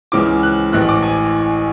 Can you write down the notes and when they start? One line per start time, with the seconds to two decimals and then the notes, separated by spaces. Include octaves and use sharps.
0.12 C#2 C#3 E3 D6
0.43 F#6
0.72 A1 A2 E3 F#6
0.89 D6
1.03 G#5